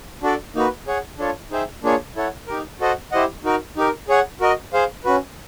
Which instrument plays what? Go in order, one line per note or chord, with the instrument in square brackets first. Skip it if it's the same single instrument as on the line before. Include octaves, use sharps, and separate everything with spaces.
[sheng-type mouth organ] D4 F#4 A4 D5
A#3 D#4 F#4 B4
G#4 C#5 F#5
D4 F4 A4 C#5
D#4 G#4 C5 E5 G5
A#3 D4 F4 G#4 C#5
E4 A4 C#5 F#5
D#4 G4 A#4
F#4 A4 C5 D#5 F#5
E4 G4 C5 D#5 F#5
D#4 F#4 A#4
D#4 G4 A#4
G#4 C#5 F#5
F#4 A#4 D#5
G#4 C5 F5
C#4 F#4 B4